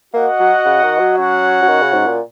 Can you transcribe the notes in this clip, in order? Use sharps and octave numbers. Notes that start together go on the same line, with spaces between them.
A#3 F#4 D#5 F#5
F#3
C#3
D#3
F#3
C#4 F#4 C#5 F#5
F#3
D#3
C#3
G#2
A#2